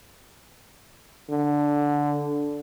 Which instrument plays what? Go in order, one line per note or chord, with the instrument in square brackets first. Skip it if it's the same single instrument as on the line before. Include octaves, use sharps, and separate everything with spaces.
[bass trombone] D3